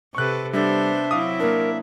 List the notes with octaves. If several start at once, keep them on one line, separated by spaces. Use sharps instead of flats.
C3 A4 B4 C#6 F#6
G3 B3 D4 A4 C5 E5
F#3 C4 E4 F5 D6 D#6
A#3 D4 A#4